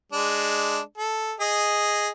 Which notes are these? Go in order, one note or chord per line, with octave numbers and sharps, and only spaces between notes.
G#3 D4
A4
G#4 D#5